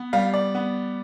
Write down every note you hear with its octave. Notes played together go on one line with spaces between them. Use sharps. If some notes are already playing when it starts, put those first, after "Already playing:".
Already playing: B3
G3 F5
D5
B3